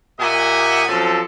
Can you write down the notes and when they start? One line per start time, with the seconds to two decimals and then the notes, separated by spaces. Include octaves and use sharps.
0.19 A#2 G4 D#5 E5 F#5 G#5
0.88 F3 F#3 C4 C#4 A4